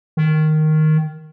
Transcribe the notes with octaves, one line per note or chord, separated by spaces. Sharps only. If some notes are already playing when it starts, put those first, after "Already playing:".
D#3